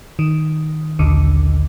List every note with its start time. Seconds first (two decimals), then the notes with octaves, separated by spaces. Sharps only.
0.19 D#3
0.99 A#1 D#2 D3